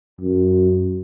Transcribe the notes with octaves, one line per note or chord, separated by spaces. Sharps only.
F#2